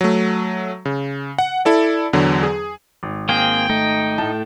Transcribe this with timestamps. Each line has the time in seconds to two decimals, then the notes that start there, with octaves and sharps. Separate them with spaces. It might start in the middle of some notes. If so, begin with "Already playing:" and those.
0.01 F#3 A3
0.85 C#3
1.38 F#5
1.65 E4 A4 D5
2.13 E2 D3 F#3
2.43 G#4
3.03 G#1
3.29 A#3 C4 G#4 G5
3.70 A3 D#4
4.18 A2 A5